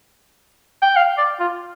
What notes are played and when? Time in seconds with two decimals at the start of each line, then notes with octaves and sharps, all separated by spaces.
0.82 G5
0.96 F5
1.18 D5
1.40 F4